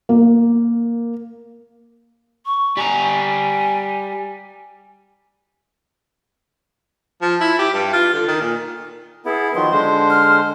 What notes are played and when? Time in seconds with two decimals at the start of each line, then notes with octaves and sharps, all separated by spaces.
0.09 A#3
2.46 C#6
2.77 G3 G#5 A#5
7.22 F3
7.40 E4
7.59 G4
7.74 G2
7.93 F4
8.13 D3
8.28 D#3
8.41 A#2
9.25 B3 E4 G#4
9.55 D#3 F3 F#3 C6
9.71 D3 G#3 C5
10.10 F6